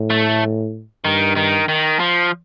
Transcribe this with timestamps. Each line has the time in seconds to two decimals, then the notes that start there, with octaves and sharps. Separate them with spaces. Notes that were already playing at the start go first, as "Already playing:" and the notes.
Already playing: A2
0.10 A3
1.05 G2 D#3
1.36 D#3
1.68 D#3
2.00 F3